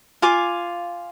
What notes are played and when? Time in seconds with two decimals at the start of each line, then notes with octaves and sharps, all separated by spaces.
0.22 F4 F5 G#5 D6